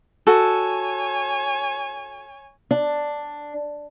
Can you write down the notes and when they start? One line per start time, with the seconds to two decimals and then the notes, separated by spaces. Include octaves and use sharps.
0.27 F#4 A4 C#5 G#5
2.71 D4